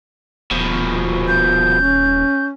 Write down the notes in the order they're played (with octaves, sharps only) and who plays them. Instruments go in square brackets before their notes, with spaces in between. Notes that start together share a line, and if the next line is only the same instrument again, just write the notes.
[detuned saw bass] D#1 [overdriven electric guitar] B2 F3
[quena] G6
[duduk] C#4